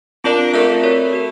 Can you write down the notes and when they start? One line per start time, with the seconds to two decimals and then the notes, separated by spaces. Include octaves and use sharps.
0.24 C4 D4 F4 A#4 D5
0.53 A3 C4 F4 A#4 D5
0.68 A3
0.84 F#4 A#4 C#5
1.13 F#4 A#4